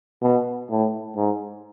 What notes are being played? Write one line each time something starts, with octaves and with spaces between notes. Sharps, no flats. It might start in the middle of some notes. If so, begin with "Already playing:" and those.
B2
A2
G#2